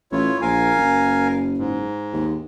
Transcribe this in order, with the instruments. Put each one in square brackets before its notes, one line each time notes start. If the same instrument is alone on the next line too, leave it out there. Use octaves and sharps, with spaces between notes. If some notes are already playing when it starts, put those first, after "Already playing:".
[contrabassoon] A1 [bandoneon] E4 F4 C#5
[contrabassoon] A#1 [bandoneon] A#4 F5 G#5
[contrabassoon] F#1
[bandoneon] G#2
[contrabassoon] D#2